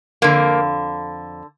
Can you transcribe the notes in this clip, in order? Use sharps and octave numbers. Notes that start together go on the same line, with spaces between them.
F2 D3 A#3